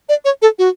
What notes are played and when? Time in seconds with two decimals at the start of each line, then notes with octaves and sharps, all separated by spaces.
0.09 D5
0.25 C#5
0.42 A4
0.59 F#4